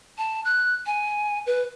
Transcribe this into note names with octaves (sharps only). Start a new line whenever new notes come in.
A5
F#6
G#5
B4